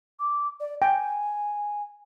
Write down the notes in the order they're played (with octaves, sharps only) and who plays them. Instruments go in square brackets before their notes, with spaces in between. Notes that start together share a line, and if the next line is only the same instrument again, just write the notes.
[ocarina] D6
D5
[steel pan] G5 [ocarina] G#5